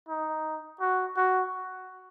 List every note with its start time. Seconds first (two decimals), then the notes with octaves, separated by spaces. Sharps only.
0.09 D#4
0.80 F#4
1.17 F#4